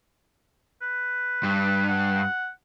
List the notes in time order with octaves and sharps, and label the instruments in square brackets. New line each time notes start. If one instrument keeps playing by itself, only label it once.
[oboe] B4
[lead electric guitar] G2
[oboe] F#5